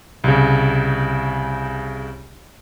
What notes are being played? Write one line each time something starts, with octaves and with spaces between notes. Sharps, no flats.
C2 C#3